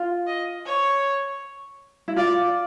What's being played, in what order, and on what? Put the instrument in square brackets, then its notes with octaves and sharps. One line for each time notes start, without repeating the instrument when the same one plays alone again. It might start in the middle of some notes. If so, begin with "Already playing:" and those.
Already playing: [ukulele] F4
[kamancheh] D#5
C#5
[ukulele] E4
[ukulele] F4 [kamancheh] D5